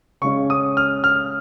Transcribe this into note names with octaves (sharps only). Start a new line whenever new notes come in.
C#3 G#3 C#4 C#6
D#6
F6
F6